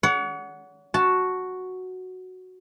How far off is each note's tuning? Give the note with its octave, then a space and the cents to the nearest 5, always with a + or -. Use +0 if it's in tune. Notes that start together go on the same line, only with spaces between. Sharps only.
C#5 +45 F#5 +0
F#4 +0 A5 +0